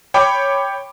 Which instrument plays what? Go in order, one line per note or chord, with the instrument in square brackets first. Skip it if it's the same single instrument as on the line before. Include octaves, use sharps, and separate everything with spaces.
[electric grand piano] C#5 G5 B5 D6